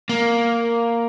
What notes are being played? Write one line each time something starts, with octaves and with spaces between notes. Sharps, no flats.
A#3